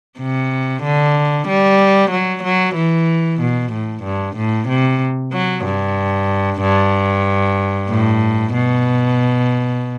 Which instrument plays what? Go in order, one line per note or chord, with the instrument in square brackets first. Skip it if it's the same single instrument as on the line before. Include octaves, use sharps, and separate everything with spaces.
[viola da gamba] C3
D3
G3
F#3
F#3
E3
B2
A2
G2
A2
C3
F#3
G2
G2
A2
B2